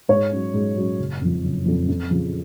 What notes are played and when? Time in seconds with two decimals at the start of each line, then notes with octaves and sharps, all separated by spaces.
0.09 G#2 C#5
0.32 F#3 C#4
0.54 G#2
0.76 F#3 C#4
0.99 F#1
1.21 F2 F3
1.43 F#1
1.66 F2 F3
1.88 F2
2.11 C#3 F3